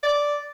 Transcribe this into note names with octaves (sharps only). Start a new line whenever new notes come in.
D5